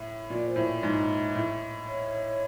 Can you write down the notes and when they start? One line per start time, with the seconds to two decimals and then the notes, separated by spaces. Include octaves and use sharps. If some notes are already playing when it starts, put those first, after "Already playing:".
Already playing: A2
0.30 A#2 D5
0.48 C5
0.56 A2
0.65 D5
0.83 G#2
1.35 A2
1.88 C#5